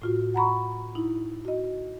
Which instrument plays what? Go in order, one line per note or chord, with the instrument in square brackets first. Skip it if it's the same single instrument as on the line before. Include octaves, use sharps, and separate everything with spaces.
[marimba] A2 F4 F#4
F#5 A#5 B5 C#6
D#4 E4
F#4 D#5